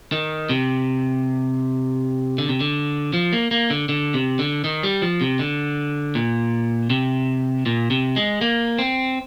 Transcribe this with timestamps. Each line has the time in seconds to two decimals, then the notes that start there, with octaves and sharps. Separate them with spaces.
0.12 D#3
0.49 C3
2.38 D3
2.49 C3
2.60 D3
3.14 F3
3.33 A#3
3.51 A#3
3.70 D3
3.89 D3
4.14 C3
4.39 D3
4.64 D#3
4.83 G3
5.02 F3
5.21 C3
5.39 D3
6.15 A#2
6.90 C3
7.66 A#2
7.90 C3
8.16 G#3
8.41 A#3
8.79 C4